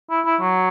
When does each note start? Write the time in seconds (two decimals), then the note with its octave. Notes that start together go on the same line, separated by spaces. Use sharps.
0.11 E4
0.26 E4
0.41 F#3